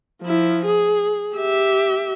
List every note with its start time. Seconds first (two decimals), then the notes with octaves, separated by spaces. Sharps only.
0.22 F3 E4
0.66 G#4
1.36 G4 E5